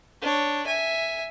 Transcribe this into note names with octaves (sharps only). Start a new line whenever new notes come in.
D4 C#5
E5 G#5